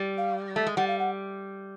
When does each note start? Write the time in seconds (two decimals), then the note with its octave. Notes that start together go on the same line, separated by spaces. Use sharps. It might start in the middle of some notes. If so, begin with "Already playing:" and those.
Already playing: G3
0.18 F5
0.56 A3
0.67 G#3
0.77 G3 F#5
0.88 F5
0.99 F#5